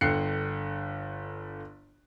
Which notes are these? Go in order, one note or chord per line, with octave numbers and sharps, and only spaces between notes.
G1 D3 G5 F#6 C7 C#7